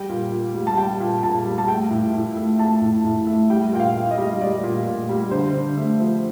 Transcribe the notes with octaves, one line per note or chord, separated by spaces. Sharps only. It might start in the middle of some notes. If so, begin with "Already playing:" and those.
Already playing: G3 G5
A#2
A#2
G3
A5
G3 G5
A#2
A#2 A5
G3
A5
A3 G5
A2
A2
A3
A3 A5
A2
A2
A3
G3 G5
A#2 G5
F5
A#2
D#5
G3
G3 D5
A#2
A#2
G3
D3 C5
D3
A3
F3